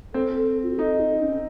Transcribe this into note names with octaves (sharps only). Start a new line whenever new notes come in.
C4 A4
A4
F4
F#4
D#4 A4
D#4
C#4